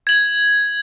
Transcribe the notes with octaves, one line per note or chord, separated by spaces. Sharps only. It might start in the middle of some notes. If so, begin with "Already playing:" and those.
G#6 F#7